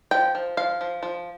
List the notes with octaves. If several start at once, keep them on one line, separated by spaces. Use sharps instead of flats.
F3 G5
F3
F3 F5
F3
F3